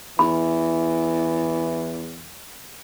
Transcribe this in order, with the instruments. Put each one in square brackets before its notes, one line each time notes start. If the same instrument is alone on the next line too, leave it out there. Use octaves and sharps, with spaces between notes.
[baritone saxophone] E2 [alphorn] E3 [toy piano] B5